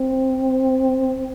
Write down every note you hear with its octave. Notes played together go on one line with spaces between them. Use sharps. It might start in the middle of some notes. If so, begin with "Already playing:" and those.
Already playing: C4